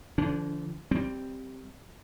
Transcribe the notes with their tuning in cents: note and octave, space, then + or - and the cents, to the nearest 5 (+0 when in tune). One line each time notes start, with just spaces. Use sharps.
D3 +0 F3 -35 D4 -35
G3 +0 C4 +0